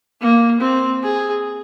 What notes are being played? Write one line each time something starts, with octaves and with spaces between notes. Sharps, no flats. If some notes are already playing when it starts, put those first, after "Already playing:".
A#3
C4
G#4